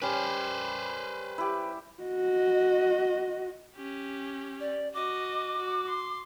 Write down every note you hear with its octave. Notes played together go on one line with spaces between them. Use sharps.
G3 C#4 B4 C5
E4 G4
F#4 D#5
C#4 G4
D5
F#4 D#5 D6
F#4
C6